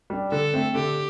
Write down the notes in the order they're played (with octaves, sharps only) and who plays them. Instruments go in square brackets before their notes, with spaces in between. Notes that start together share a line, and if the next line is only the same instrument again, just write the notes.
[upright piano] G3 D4
[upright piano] D3 [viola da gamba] A4
[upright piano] A3 C4
[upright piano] D3 [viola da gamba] G4